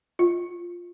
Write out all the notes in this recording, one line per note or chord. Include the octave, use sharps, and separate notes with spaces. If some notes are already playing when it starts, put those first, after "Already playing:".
F4